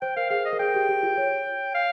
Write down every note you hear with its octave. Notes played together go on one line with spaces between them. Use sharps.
C5 G5
A#4 F5
G#4 F5
D#5
A#4
G#4 G5
G4
G4
F4
C#5
F5